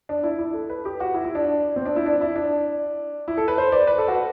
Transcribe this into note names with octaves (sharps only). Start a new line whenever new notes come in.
D4
E4
E4
A4
B4
G4
F#4
E4
E4
D4
C4
D4
E4
D4
E4
D4
E4
A4
B4
C5
D5
B4
A4
F#4